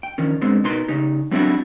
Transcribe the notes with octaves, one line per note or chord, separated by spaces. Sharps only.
G5
D#3 F3 C#4
D2 G#2 D3 G#3 B3 C4
B2 D#4 A#4 B4 C6
C#3 D#4 G4
F#3 G3 C4 D4 E4 F#4